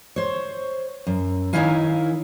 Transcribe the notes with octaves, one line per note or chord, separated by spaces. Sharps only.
C5 C#5
F#2
D#3 D#4 E4 C#5 F5 G#5